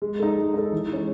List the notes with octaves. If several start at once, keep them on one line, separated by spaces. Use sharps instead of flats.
G#3
D#4 A4
G#3
D#4 A4
E3
G#3 C#4